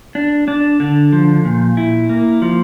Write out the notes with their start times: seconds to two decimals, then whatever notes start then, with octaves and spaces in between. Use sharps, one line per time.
0.15 D4
0.48 D4
0.80 D3
1.13 F3
1.45 A#2
1.77 E4
2.10 A#3
2.42 F3